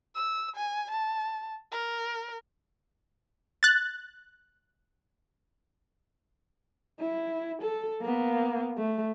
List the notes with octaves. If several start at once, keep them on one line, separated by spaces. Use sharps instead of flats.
E6
G#5
A5
A#4
F#6 A6
E4
A4
A#3 B3
A3